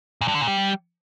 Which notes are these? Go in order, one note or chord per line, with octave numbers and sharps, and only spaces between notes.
A#2
G2
D3
A#2
G3